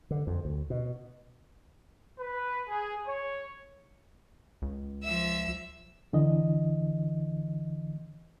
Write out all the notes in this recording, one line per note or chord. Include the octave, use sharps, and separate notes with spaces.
D3
F2
D2
B2
B4
G#4
C#5
C#2
F3 E5 E6
C2 D3 E3 D#5